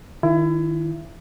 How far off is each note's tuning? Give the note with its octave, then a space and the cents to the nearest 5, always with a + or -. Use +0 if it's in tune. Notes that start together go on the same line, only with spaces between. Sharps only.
D#3 +0 E4 +30